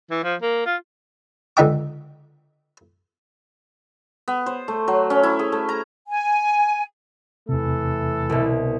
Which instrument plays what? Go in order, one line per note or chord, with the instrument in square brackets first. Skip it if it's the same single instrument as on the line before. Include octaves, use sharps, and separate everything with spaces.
[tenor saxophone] E3
F3
A#3
F4
[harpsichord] C#2 D3 D#4 E5 G5 D6
[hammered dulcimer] B3
C5
A3
F#3
C#4
E4
G#4
A3
A#5
[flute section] G#5
[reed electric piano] E2 C3 [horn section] E3 A3 A4
[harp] C2 B2